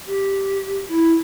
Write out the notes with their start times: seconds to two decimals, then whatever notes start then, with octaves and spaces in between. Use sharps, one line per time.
0.07 G4
0.88 E4